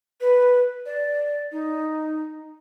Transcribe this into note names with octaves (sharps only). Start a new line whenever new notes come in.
B4
D5
D#4